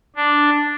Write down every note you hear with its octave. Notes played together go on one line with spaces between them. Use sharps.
D4